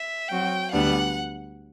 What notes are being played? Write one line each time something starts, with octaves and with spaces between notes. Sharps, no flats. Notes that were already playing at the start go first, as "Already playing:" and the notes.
Already playing: E5
F#3 C4 F#4 G5
D2 D3 G3 B3 D4 F#5